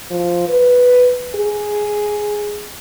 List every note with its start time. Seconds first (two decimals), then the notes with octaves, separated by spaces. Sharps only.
0.11 F3
0.48 B4
1.35 G#4